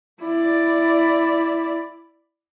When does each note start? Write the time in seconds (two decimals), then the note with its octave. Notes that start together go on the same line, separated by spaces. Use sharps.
0.21 E4 D5